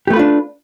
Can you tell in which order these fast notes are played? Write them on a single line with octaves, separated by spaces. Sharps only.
G4 A3 B4 F4 D4